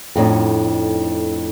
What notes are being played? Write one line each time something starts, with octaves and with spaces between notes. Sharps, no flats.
F2 A2 D4 D#4